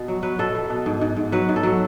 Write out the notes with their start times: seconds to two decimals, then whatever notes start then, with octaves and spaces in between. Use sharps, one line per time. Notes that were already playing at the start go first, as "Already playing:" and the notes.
Already playing: B2
0.08 F#3
0.23 F#3 B4
0.39 B2 A4
0.55 B2
0.70 B2
0.86 G#2
1.01 G#2
1.16 G#2
1.32 F#3 B4
1.49 G#2
1.56 A4
1.63 F#3